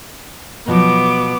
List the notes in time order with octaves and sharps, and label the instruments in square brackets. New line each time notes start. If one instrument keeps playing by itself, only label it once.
[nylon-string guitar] B2 F3 F#3 [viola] B3 D6